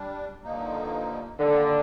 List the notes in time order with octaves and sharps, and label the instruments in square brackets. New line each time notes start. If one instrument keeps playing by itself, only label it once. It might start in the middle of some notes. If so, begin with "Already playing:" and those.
Already playing: [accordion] G3 D4
G2 D3 F3 A#3 D#4
[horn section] D3 [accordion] D#3 G3 A#3